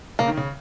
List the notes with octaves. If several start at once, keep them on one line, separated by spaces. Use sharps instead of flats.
C#3 A#3
D#3
C#3